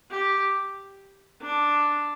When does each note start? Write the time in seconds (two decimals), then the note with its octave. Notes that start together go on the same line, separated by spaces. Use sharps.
0.11 G4
1.42 D4